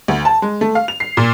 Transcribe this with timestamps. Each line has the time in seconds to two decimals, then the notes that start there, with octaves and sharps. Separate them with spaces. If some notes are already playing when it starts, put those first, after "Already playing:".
0.08 D2
0.25 A5
0.42 G#3
0.61 A3
0.75 F5
0.88 F7
1.00 C7
1.17 A#2